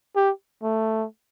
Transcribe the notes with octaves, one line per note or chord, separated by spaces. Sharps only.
G4
A3